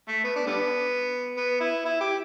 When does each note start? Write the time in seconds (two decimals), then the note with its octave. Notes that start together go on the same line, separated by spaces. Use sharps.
0.08 A3
0.24 B3
0.36 D4
0.47 D3 G3 B3
1.37 B3
1.61 E4
1.85 E4
2.01 G4